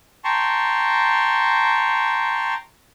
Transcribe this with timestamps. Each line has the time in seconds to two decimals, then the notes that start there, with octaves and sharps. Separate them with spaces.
0.24 G5 A5 A#5 C6 C#6